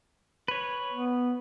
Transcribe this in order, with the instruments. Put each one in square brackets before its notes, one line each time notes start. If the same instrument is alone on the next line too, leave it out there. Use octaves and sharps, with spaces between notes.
[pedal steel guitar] B4 C#5
[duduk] B3